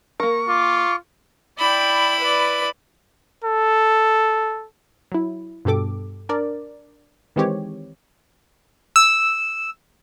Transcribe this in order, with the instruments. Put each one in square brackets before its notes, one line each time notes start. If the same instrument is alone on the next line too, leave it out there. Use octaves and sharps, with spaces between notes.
[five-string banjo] A#3 A#4 [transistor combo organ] C#6
[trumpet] F4 [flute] D6
[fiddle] E4 B5 [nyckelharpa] D5 G5
[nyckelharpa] B4 D5
[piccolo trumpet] A4
[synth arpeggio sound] F#3 E4
G2 B2 G4 A4 D6
D4 A#4 D5
D#3 E3 G#3 C4 G4 C#5
[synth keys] E6